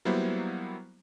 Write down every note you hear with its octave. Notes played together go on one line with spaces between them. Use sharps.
F#3 G3 A#3 B3 E4 C5